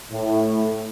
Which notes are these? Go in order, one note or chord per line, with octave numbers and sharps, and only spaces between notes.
A2